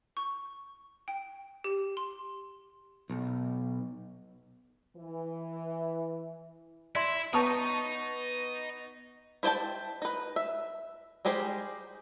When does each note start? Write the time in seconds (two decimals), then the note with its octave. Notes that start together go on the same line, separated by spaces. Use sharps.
0.17 C#6
1.08 G5
1.64 G4
1.97 C6
3.10 B1
4.96 E3
6.95 E4 D5 E5 C6
7.33 B3 C#5 D#5 A5 A#5 C#6 D#6
9.43 E4 C5 C#5 G5 A5
10.02 D#4 B4
10.36 E5
11.25 G3 G#3 D#4 G4 C5